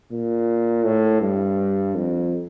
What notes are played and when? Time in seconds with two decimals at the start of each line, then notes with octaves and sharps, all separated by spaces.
0.11 A#2
0.85 A2
1.21 G2
1.95 F2